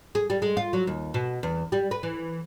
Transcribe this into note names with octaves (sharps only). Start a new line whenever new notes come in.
G#4
G3
G#3
F4
F#3
D#2
B2
E2
G3
B4
E3